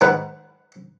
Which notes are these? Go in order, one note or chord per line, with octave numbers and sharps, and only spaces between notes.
G#2 D#3 B4 F#5